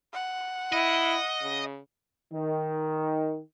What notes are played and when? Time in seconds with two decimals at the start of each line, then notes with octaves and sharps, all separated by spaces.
0.13 F#5
0.73 E4 D#5
1.42 C#3
2.32 D#3